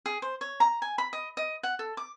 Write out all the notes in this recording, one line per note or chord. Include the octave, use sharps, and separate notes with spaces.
G#4
C5
C#5
A#5
G#5
B5
D#5
D#5
F#5
A4
D6